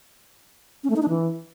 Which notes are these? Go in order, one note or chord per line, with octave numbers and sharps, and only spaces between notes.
C#4
A3
D#4
D4
E3